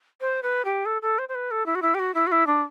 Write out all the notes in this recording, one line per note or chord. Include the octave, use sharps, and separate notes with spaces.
C5
B4
G4
A4
A4
C5
C5
B4
A4
E4
F#4
E4
G4
F#4
E4
F#4
E4
D4